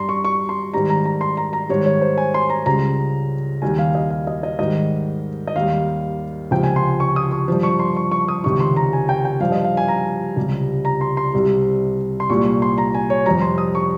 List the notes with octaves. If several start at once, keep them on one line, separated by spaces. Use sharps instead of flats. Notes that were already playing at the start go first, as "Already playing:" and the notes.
Already playing: G2 G3 A#5 C6
C#6
C#6
C6
G#2 D#3 G3 A#5
A#5
A#5
C6
A#5
A#5
G#2 D#3 G3 C#5
C#5
C5
G#5
C6
A#5
C#2 C#3 G3 A#5
D#2 D#3 G3 G#5
F5
D#5
F5
D#5
D#5
G#2 D#3 G3 D#5
D#5
D#2 D#3 G3 F5
C#2 C3 F3 G5
G#5
C6
C#6
D#6
C#6
G2 F3
C#6
C6
C#6
C#6
D#6
C#2 C3 D#3 C#6
C6
A#5
G#5
G5
G5
G2 F3 F5
D#5
F5
G#5
A#5
C#2 C3 G3
A#5
C6
C6
C2 C3 G3
C6
C2 A#2 G3 C#6
C#6
C6
A#5
G#5
C#5
F2 C3 G3 A#5
C6
D#6
C#6